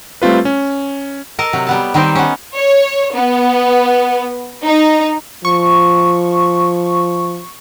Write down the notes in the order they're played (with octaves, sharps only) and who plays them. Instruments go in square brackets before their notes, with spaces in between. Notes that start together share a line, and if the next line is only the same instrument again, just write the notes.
[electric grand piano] G3 A3 C4 F4 B4
C#4
[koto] A4 A#4 D#5 A5
C3 F#3
G3 B3 A5
D#3 G3 C4 D#4 C5
B3 C#4
[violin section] C#5
B3
D#4
[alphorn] F3 [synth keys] C#6